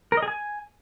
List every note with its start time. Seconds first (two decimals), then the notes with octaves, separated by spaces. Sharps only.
0.12 A#4
0.17 D#5
0.22 G#4
0.28 G#5